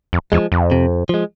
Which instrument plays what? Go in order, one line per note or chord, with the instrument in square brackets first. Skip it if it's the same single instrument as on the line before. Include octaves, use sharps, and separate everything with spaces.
[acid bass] F2
[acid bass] E2 [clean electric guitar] F3 G#3
[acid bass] F2
[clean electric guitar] C3
F3 G#3